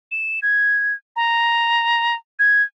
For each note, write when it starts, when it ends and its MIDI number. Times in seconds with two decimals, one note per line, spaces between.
0.11 0.40 100
0.42 0.94 92
1.16 2.15 82
2.39 2.62 92